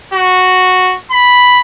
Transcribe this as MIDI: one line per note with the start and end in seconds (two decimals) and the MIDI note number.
0.14 0.95 66
1.11 1.60 83